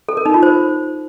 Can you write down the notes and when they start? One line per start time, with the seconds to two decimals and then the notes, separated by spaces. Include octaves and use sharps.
0.09 A4
0.17 A#4
0.26 D#4
0.34 F4
0.43 C5